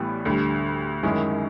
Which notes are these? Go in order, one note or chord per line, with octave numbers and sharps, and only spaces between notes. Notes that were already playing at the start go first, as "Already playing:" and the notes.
Already playing: A1 A2 E3 G3 B3
D2 D3 G3
F#2 D#3 G#3 C#4 E4